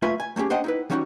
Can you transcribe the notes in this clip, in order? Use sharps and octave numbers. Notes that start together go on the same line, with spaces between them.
A3 F4 B4 E5 G#5
G#5
A3 A#3 C#4 G4 G#4
D4 C5 D#5 F#5 G5
D#4 E4 B4
E3 G3 C#4 D#4 F4 F#4